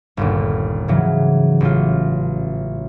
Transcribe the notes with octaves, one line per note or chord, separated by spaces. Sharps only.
G1 D#2 A#2
G#2 C#3 E3 F#3
A1 F4